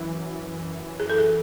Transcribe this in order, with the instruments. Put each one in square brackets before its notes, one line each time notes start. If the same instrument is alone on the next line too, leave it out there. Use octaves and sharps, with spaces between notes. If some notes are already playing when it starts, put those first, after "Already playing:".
Already playing: [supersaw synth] F#2 E3
[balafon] G#4
A4
G#4